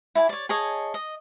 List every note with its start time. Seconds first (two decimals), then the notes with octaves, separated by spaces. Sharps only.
0.15 E4 D5 G#5
0.29 C#5 D5
0.49 G#4 C#5 D#5 A5
0.94 D#5